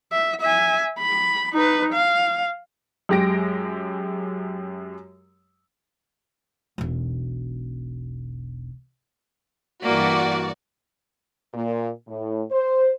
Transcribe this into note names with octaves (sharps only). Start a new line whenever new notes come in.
E5
E5 G#5
B5
D#4 B4
F5
F#2 G#3 G4 G#4 A#6 D7
E1 B1
G2 E3 A#3 F#4 D5
A#2
A2
C5